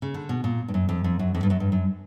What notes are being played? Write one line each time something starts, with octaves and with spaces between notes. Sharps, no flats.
C#3
D3
B2
A#2
G2
F#2
F2
F2
F#2
F2
G2
F#2
G2
F#2